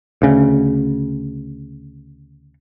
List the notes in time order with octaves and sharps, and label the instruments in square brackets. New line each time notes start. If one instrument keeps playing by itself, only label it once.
[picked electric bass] D2 C#3